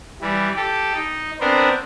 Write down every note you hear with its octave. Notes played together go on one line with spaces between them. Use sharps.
E3 G3
G4 A4
D#4
B3 C4 D4 A#4 C5